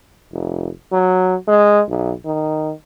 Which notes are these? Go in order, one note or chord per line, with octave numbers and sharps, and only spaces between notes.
F1
F#3
G#3
B1
D#3